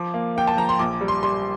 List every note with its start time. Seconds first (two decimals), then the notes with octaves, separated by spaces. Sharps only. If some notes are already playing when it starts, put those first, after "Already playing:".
Already playing: F3 D6
0.14 A#3
0.36 A#3 G5
0.47 A5
0.57 F3 A#5
0.69 C6
0.79 A#1 D6
1.01 G3
1.08 C6
1.23 G3 C6